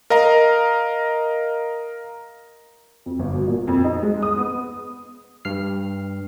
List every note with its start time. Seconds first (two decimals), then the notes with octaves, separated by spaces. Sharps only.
0.10 A#4 D#5 F5 A#5
3.06 F2
3.19 G1
3.33 B2
3.47 A#2
3.68 F2
3.84 D#4
4.02 G#3
4.23 D#6
4.37 B3
5.45 G2 F6 C7